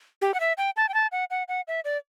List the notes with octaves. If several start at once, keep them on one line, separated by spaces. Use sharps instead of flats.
G4
F#5
E5
G5
A5
G5
A5
F#5
F#5
F#5
E5
D5